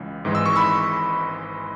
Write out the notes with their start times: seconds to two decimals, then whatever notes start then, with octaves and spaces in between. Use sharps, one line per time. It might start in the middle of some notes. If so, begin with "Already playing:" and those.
Already playing: C#2 C#3 E3 G#3
0.24 G#1 G#2 E3 G#3
0.35 E6
0.46 C#6
0.56 B5 E6